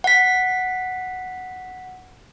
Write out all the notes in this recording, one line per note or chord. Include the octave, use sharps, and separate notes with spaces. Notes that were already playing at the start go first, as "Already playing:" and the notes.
F#5 B6